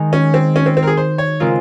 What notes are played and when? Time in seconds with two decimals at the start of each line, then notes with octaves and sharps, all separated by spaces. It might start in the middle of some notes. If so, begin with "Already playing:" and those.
Already playing: D#3 G#3 D#4
0.13 C#4
0.34 C4
0.56 C#4
0.66 C4
0.77 C4
0.83 A#4
0.87 G#4
0.97 C5
1.18 C#5
1.40 C#3 G#3 C4 F4 A#4